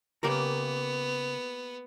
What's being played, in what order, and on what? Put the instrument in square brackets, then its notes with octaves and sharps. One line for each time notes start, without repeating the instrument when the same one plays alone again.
[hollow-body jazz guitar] C#3 A#4 A#5 [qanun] A#3 G4 [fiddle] B3